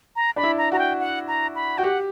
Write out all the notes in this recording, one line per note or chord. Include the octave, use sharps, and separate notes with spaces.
A#5
D4 B5
E4
A#5
F#4 A#5
G5
F#5
A#5
B5
F#4 G5
G4 F#5